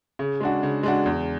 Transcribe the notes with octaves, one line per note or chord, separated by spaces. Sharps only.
C#3
G#3 D4 F#4
C#3
G#3 D4 F#4
E2